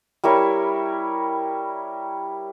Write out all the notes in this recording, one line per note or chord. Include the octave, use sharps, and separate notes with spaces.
G3 E4 A#4 C#5